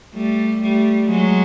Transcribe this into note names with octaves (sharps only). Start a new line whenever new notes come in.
G3 A3
G3 A3
F#3 G#3